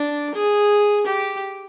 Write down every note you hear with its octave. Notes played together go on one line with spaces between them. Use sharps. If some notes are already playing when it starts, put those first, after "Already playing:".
Already playing: D4
G#4
G4